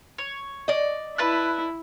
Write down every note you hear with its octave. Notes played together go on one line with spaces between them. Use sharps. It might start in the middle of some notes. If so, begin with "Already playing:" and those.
C#5
D5 D#5
E4 B4 A5 F#6